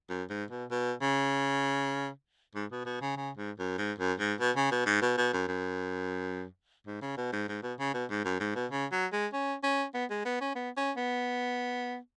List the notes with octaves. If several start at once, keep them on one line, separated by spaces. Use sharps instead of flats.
F#2
G#2
B2
B2
C#3
G#2
B2
B2
C#3
C#3
G#2
F#2
G#2
F#2
G#2
B2
C#3
B2
G#2
B2
B2
F#2
F#2
G#2
C#3
B2
G#2
G#2
B2
C#3
B2
G#2
F#2
G#2
B2
C#3
F#3
G#3
C#4
C#4
B3
G#3
B3
C#4
B3
C#4
B3